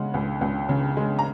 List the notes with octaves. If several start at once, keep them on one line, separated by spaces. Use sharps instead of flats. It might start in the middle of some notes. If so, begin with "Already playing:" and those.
Already playing: C#3 G#3 F#5
C#2
C#2
C#3
G#3
A#5